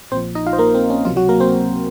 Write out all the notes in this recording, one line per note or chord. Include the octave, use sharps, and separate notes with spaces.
A#1 A#2 F3 C4 C5
D#4 D#5
F4 F5
C5
A#3 A#4
C4
C#4
C#2 C3 F3 F#3 F4
F#3 F#4
A#3 A#4
C4 C5